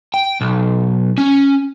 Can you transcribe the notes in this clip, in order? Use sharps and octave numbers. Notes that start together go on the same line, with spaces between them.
G5
B1
C#4